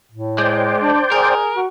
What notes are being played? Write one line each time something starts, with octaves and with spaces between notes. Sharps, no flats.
A2
G#3 C5 D5 G5
D4
G#4 A#4
F#4